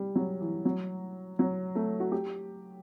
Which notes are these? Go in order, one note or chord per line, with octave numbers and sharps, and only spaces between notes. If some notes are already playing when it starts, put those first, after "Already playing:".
Already playing: G3
F#3
E3
F#3
F#3
A3
F#4
G4